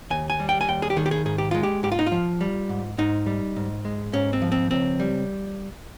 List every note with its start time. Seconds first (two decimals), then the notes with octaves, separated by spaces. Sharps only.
0.10 D#2 G#5
0.30 G#5
0.40 G3
0.49 G5
0.61 G#5
0.68 D#2 G5
0.82 G#4
0.90 G4
0.97 D#3 G#4
1.06 G4
1.11 G#4
1.25 G#2 G#4
1.38 G4
1.51 G#3 F4
1.63 G4
1.83 G#2 G4
1.92 F4
1.99 D#4
2.06 F4
2.12 F3
2.41 G3
2.69 G#2
2.98 G#2 D#4
3.26 G3
3.56 G#2
3.85 G#3
4.13 G#2 C#4
4.33 C4
4.42 F3
4.52 C4
4.71 C#2 C4
5.00 G3